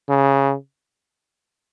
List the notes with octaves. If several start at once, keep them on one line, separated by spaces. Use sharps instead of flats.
C#3